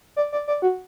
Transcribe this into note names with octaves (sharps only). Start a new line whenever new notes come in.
D5
D5
D5
F#4